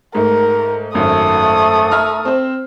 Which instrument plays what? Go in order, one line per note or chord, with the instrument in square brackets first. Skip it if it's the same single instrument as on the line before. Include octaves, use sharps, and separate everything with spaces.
[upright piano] G#2 A3 [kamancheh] A#4
[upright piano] G#1 F#2 [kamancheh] A3 D#6
[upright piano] E5 A#5 F6
C4 C5